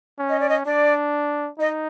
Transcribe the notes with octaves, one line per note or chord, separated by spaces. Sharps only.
C#4
D#5
D5
D#5
D4 D5
D#4 D#5